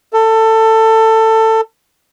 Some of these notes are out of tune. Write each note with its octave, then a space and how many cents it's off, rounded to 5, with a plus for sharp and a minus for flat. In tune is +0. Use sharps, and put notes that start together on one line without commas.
A4 +20